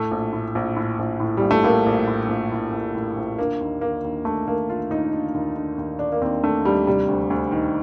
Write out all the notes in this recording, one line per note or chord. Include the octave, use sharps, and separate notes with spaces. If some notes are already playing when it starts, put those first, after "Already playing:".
Already playing: A2 A3
A#1
A2
A#1
A2
A#1
A2
A#1 G3
A3
A2 A#3
A#1
A2
A#1
A2
A#1
A2
A#1
D3 A#3
D#2
D3 A#3
D#2
D3 A3
D#2 A#3
D3 F4
D#2 D#4
D3
D#2
D3
D#2
D3 D4
A#3
D#2 C4
D3 A3
D#2 G3
C3 G3
D2
D2
D#3